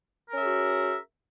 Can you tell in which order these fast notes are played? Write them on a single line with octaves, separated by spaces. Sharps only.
A#4 C#4 E5 G#4 F#4